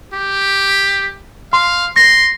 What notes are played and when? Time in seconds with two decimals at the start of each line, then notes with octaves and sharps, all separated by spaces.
0.13 G4
1.53 F5 C6
1.96 C6 A#6